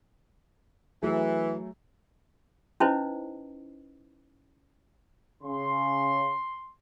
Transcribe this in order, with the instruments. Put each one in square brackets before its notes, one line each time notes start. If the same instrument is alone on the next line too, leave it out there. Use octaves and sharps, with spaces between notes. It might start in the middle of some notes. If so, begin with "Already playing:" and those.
[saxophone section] E3 [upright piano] F#3 A3 G#4
[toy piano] C#4 D#4 E4 B4 C5 D#5
[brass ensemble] C#3 [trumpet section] C6